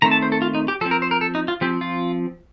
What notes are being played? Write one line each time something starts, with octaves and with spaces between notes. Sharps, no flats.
D#3 A3 C4 A#5
A5
C5
A4
F4
D#4
G4
F3 C4 A4
A#4
C5
A#4
A4
D#4
F4
F3 C4 G4
F4